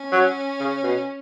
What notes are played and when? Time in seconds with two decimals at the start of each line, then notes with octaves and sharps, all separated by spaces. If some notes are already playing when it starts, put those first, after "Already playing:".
Already playing: C#4
0.12 F#3
0.60 C#3
0.83 B2